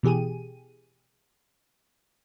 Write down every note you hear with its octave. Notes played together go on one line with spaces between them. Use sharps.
B2 E3 G4 G#4 D#7